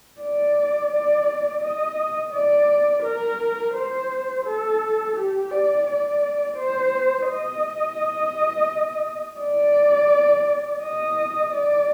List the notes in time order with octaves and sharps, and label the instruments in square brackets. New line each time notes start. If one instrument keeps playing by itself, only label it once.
[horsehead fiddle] D5
D5
D#5
D5
A#4
C5
A4
G4
D5
D5
C5
D#5
D5
D#5
D5